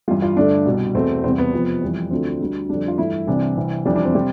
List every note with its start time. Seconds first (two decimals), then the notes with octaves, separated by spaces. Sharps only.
0.08 G2 E3 G3 F4
0.22 F4
0.37 G2 D3 A3 D4
0.66 C2 B2 G3
0.95 E2 B2 A3 C4
1.24 E2 C3 G3 C4
1.38 B3
1.53 F2 C3 F3
1.82 F2 E3 G3
2.11 D2 D3 F3 A3 C4
2.40 D2 D3 G3
2.69 F2 D3 G3 D4
2.88 F4
2.98 G2 E3 A3 E4
3.27 C2 C3 E3 D4
3.57 C2 C3 E3
3.86 F2 E3 G3 D4
3.96 D4
4.05 C4
4.15 C3 G3